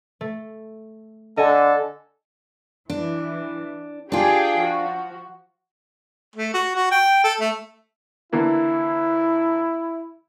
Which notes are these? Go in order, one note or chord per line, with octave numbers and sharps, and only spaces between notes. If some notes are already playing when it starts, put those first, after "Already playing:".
A3
D3 A4 D#5 G#5
E3 D4
D4 F4 G4 G#4 G5
F3 F#4
A3
F#4
F#4
G5
A4
A3
D3 E3 A#3 E4